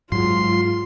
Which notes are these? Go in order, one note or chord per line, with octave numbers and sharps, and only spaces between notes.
G#2 F#3 F4 C6